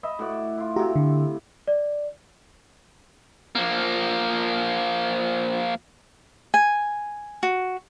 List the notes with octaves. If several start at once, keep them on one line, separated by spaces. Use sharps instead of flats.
D#5 E5 B5
A2 F#4 D5
E4 F4
A2 C3 F#4 G4 A#5
D3
D5
F3 A#3
G#5
F#4